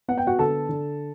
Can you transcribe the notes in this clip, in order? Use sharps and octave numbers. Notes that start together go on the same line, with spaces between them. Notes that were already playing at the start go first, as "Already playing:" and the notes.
B3 F#5
G5
F#4 F#5
D3 A4 A5
D3